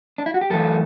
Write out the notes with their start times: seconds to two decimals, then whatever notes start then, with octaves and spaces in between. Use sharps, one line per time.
0.18 D4
0.26 E4
0.34 F#4
0.41 G4
0.50 F#2 E3 A3 A4